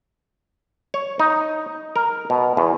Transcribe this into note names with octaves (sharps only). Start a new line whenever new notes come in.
C#5
D#4
A#4
B2
E2